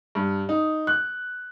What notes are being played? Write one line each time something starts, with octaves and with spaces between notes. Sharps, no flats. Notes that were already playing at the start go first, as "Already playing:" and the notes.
G2
D#4
F#6